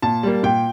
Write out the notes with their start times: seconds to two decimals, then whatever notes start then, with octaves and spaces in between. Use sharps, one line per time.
0.02 A#2 A5
0.23 G3 A#3
0.43 A#2 G5